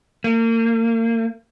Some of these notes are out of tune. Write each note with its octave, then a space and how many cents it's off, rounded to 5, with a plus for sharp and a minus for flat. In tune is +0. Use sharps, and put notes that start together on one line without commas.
A#3 -35